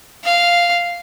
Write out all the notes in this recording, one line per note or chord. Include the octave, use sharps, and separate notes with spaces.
F5